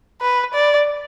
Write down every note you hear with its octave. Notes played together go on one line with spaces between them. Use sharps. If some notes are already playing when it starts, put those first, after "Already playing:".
B4
D5